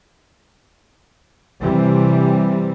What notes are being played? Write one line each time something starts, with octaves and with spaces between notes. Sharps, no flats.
C3 E3 G3 C4